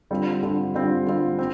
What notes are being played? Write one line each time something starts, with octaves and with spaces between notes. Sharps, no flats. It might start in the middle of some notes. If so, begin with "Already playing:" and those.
D3 G3 C4 F4
D3 G3 C4 F4
D3 G3 C4 F4
D3 G3 C4 F4
C4